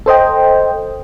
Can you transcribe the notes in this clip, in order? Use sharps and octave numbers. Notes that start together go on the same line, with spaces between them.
A4 C5 D#5 G5